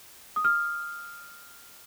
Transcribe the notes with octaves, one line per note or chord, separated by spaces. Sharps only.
D#6
F6